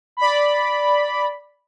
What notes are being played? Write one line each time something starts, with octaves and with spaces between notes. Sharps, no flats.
D5 B5